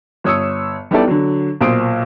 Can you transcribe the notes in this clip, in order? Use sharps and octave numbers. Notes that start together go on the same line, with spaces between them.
G1 C#5 D#6 E6 C#7
G3 B3 D#4 E4 A4 D5
D3 F#3
B1 A#2 C5 D#6 D7